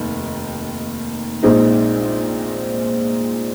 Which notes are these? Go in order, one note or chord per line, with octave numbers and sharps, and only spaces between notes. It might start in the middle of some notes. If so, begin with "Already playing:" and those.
Already playing: F1 D#2 D#3
A#1 A#2 G#3 C4 D#4